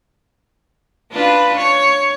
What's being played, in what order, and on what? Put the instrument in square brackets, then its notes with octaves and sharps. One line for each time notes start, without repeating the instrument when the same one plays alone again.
[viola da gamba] D4 F4 B4
C#5